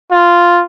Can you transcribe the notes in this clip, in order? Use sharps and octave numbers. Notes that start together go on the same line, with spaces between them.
F4